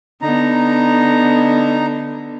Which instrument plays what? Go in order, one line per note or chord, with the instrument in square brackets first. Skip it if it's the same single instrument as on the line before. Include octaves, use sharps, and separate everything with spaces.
[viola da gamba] D3 B3 [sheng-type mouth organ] D#4 A#5